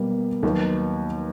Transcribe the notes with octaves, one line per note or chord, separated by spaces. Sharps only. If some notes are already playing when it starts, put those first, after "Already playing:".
Already playing: B2 G3 A#3
D#2 D#3 F#3 B3